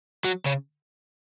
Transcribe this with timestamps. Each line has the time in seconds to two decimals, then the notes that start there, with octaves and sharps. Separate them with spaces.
0.24 F#3
0.46 C#3